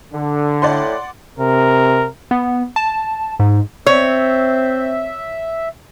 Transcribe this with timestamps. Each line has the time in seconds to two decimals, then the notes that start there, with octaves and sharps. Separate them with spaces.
0.13 D3
0.62 A2 D5 F#5 C6
1.39 C3 A#4
2.31 B3
2.76 A5
3.40 G#2
3.86 C4 C#5 E5